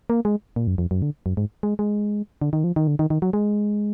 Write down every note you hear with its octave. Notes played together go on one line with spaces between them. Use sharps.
A#3
G#3
A#2
F#2
F2
F#2
D3
F#2
G#2
G#3
G#3
D3
D#3
F3
D#3
D3
D#3
D#3
F#3
G#3